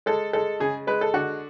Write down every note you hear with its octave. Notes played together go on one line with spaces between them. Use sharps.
G#3 A4
G#3 A4
C#3 G#4
G#3 B4
A4
D3 F#4